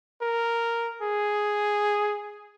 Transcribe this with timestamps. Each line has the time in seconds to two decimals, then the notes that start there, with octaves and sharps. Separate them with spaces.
0.22 A#4
1.02 G#4